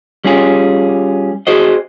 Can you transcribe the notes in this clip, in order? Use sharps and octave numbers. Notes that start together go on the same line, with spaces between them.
G3 C#4 F4 G#4
F#4 G#4 C5 D#5